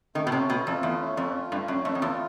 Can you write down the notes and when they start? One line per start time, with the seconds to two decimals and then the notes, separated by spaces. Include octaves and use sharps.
0.15 D#3 A3
0.27 B2
0.32 C3 C#4
0.50 B2 A3
0.66 F2 F4
0.83 E2 A3
1.01 C#4
1.17 F2 A3
1.34 F4
1.51 G2 A3
1.68 F#2 C#4
1.85 F2 A3
1.95 F2
2.02 E2 F4